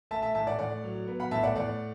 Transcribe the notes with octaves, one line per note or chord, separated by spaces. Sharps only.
A3 E5 A5
E5 A5
A2 E5 A5
D5 F#5
A2 D5 F#5
F#3
B3
F#5 B5
A2 E5 A5
D5 F#5
A2 D5 F#5